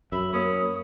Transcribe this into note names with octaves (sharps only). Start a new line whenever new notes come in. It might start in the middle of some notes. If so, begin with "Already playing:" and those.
F#2 E5 B5
A#3 C#4 C#5 D#6